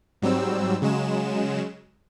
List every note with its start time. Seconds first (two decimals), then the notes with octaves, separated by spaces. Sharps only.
0.22 G#2 F#3 G3 C4 E6
0.82 C#3 F#3 G#3 E7